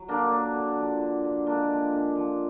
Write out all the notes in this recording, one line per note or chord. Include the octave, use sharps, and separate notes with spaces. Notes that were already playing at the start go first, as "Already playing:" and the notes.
Already playing: F#3
D3 A#3 D4
F#3
D3
F3
D3
D3
G#3 A#3 D4
F3
D3
F3